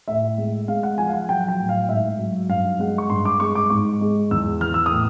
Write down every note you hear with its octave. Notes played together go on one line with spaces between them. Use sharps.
A2 E5
G#3
G#3 F5
F#5
F3 G#5
F5
F#5
F#3 G5
G5
A2
F5
G#2 E5
F#3
G2 F5
G#3 F#5
C#6
G2 C6
D6
G#3 C#6
D6
G#2 C#6
G#3
E2 E6
E3 F6
E6
D#6
A2